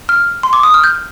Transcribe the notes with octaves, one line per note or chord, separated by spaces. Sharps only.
F6
C6
D6
D#6
F6
G6